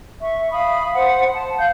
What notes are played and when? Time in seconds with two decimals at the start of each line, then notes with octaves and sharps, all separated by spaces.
0.21 E5 C#6
0.52 F5 B5 D#6
0.94 C5 F#5
1.34 A5
1.59 F5 G6